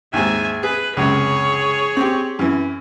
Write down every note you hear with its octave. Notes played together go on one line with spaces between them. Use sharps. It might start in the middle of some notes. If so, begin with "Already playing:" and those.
D#2 G#2 E5 G#5
G#4 B4
C#2 F#2 C3 G#4 C#5
C4 G4
F#2 E3